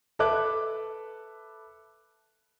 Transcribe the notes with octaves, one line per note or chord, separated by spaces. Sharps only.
A4 B4 E5 D6 F#6